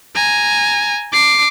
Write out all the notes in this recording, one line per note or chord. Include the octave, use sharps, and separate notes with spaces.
G#5 A#5
D6 C7